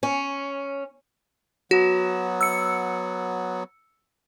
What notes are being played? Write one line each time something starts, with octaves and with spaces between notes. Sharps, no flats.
C#4
F#3 B3 F#4
E6 C#7